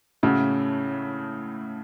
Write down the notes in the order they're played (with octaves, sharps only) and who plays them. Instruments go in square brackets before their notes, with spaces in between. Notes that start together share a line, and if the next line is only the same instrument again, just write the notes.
[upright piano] A2 A3 F#4 [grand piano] C#3